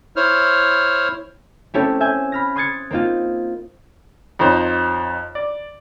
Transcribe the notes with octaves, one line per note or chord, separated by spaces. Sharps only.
E4 C5 C#5 F6
A3 C4 C#4 E4 G4 A4
E5 G#5 G6 G#6
B5 F6 A#6
C6 D#6 F#6 G#6 A6 C#7
A#3 C4 D#4 F4
F2 D#4 C5 C#5
D5